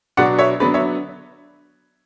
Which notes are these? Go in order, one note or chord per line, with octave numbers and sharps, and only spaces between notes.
B2 F#3 B3 D4 D5 F#5
C#5 E5
D3 F#3 B3 D4 B4 D5
C#5 E5